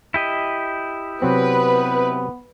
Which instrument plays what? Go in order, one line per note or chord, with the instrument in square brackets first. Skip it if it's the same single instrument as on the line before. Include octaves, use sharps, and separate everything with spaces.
[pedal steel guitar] E4 G4 D#5
[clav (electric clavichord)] C3 F#3 C4 [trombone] B3 [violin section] B4